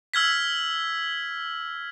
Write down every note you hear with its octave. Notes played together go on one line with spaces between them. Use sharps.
E6 F6 G#6 B6